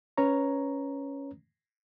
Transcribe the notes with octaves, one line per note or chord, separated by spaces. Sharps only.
C#4 B4 C#5 A#5